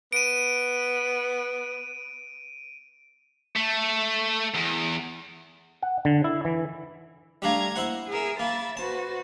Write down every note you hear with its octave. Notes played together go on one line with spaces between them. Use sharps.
B3 D7 D#7
A3
E2
F#5
D3
E4
E3
G3 A3 D4 F5 A#5 G#6
A#3 E4 C5 F#5
G#4 A#4 E5
A#3 E5 B5 A6
F#4 B4 C5 A5